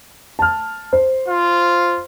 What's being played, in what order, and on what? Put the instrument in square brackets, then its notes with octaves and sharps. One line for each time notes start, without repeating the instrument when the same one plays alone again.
[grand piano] A5 F6
C5
[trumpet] F4